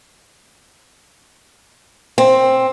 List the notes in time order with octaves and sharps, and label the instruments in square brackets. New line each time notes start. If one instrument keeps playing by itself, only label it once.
[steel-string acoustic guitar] C4